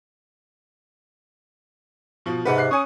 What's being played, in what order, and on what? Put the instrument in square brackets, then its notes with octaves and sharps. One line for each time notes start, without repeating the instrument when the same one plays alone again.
[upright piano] B2 F3
[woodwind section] G#2 C3 [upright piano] B4 F#5
[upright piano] F#6 C7
[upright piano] C#4 G#5 [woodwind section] C#5 C#6 D#6